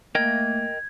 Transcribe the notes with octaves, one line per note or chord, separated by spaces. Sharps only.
A3 A#3 A#4 D#5 G5 G#6